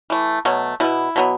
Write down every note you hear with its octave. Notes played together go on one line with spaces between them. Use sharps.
E3 A3
B2 F#3 A3
B2 B3 E4
B2 F#3 B3